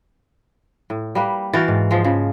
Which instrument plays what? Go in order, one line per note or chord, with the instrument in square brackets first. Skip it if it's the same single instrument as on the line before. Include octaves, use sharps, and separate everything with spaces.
[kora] A2
G3 A#3 B4
[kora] E3 F#4 [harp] F5 G5 A6
[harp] G#2
[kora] F3 G#3
C#3 F3